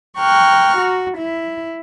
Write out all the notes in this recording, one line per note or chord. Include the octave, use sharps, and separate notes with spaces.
G5 A#5 C#6 F6 F#6
F#4
E4